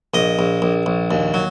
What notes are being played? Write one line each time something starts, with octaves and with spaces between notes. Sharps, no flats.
A#1 D#5
A#1
A#1
A#1
D#2
F#3